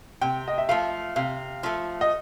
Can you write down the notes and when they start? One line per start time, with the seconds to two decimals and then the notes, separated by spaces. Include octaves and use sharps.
0.21 C3 G5
0.48 D#5
0.58 E5
0.69 F3 A3 F5
1.16 C3 F5
1.63 F3 A3
2.01 D#5